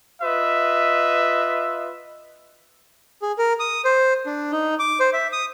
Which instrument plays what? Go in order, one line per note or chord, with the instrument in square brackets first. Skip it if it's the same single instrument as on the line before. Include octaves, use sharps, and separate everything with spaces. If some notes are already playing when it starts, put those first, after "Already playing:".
[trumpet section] F4 B4 D#5 E5
[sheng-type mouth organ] G#4
A#4
D#6
C5
D4
D#4
D6
C5
E5
D#6